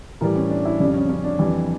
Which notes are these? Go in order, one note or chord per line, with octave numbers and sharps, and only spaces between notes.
A2 E3 G3 A#4
C#4
D4
E4
F2 C#3 G3 D4
C#4
C#4
D4
F2 E3 G3